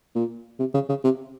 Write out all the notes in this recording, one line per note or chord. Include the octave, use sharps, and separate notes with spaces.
A#2
C3
C#3
C#3
C3